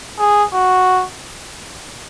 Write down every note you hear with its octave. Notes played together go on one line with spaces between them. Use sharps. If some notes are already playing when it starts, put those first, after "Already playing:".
G#4
F#4